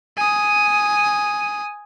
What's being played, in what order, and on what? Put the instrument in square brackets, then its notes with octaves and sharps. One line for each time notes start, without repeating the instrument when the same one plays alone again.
[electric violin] G#5 D#6